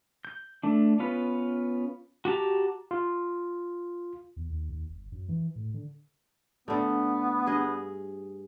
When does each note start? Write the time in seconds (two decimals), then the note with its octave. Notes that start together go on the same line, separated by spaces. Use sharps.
0.25 G6
0.63 A3 D4
0.99 B3 C#4 F4 B4
2.25 F#4 G4 A5 A#5
2.91 F4
4.36 E2
4.50 D#2
4.70 D#2
4.90 G1
5.12 F#2
5.29 E3
5.56 A2
5.74 D3
6.68 D3 A3 B3
7.47 G2 G#4 D#5